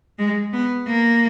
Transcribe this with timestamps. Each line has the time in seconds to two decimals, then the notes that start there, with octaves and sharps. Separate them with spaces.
0.19 G#3
0.53 B3
0.88 A#3